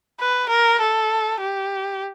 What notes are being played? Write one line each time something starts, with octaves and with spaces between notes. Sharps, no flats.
B4
A#4
A4
G4